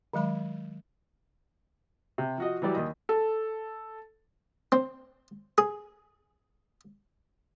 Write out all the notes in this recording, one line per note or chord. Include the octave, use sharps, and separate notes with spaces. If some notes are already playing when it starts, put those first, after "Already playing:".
D#3 F#3 G#3 B5
C3
F3 F#4 D#5
E3 F#3 G3 D5
D#2 D#5
A4
C4
G#4